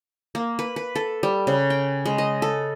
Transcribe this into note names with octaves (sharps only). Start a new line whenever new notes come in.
A#3
B4
B4
A4
G3
C#3
G5
G#3
D#5
A4